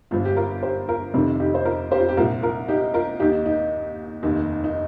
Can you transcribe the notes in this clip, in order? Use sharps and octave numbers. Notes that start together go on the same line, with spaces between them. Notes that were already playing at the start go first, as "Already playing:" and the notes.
G1 G2 F3 F4
G4
F4 A#4
G4 C5
F4 A#4
F1 F2 C3 D#3 F4
D#4 G4
C5
F4 A#4
G4 C5
F4
G4
C2 A#2 F3 F4 A#4
F4 A#4
D#4 G4
F4 A#4
D#2 D#3 D#4 G4
D#4
F1 D#2 D#3
D#4